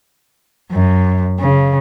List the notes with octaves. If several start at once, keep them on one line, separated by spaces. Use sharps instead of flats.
F#2
C#3